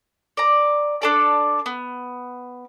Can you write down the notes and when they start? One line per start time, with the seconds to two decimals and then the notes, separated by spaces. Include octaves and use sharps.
0.37 D5 A#5
1.02 D4 A4 D5
1.66 B3